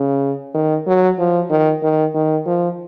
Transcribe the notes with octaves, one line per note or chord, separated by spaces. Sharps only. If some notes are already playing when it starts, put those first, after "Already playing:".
Already playing: C#3
D#3
F#3
F3
D#3
D#3
D#3
F3